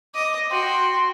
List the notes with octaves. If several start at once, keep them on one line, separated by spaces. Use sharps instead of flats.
D#5 D6 A#6
F#4 G5 C6